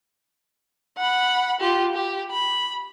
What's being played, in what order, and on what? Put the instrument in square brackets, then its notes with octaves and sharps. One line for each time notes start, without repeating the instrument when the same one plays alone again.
[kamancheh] F#5 B5
F4 G4
G4
B5